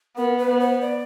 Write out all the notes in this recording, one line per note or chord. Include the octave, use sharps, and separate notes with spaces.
B3 A#4
B4
B3
C5
D5